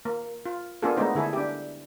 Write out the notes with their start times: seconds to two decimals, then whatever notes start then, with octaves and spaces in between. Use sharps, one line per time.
0.05 A#3
0.46 F4
0.82 A#3 B3 D4 F4 G#4 A4
0.97 G#3 A3 B3 D4 D#4 C5
1.15 D3 E4 G#4 A4
1.33 D4 G4